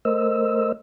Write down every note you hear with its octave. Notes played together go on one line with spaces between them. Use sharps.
A3 A#4 C5 D#5 E6